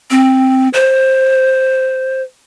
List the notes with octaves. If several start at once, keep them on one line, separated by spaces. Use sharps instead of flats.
C4
C5